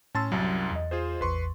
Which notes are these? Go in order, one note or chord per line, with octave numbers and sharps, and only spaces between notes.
A2 C#4 A5 C6 E6 A6
C2 F#2 F#3
E2 D#5
F4 G#4 C5
A1 E2 B4 C6 C#6